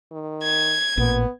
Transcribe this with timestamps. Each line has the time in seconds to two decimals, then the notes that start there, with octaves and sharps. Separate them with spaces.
0.12 D#3
0.43 G#6
0.97 A1 A#2 B3